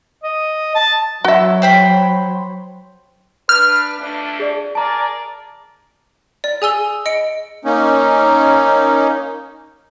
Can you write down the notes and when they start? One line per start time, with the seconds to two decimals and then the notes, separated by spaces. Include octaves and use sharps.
0.24 D#5
0.75 A5
1.25 F#3 F#4 E5
1.62 C5 G5 B5
3.49 D4 B4 F6 G6
3.99 F2 A3 D4
4.39 G#4 D5
4.75 G#4 A#4 D5 A5 A#5
6.44 D5
6.62 G#4 G#5 E6 G7
7.06 D#5 C#7 D7
7.65 A#3 C#4 D#4